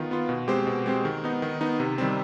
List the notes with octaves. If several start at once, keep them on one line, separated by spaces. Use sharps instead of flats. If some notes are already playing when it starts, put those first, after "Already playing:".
Already playing: D#3 B3 F4
B3 F4
B2
G#3 C4 G4 C5
B2
G#3 C4 G4 C5
D#3
B3 D#4
D#3
B3 D#4
C3
D#3 G3 C4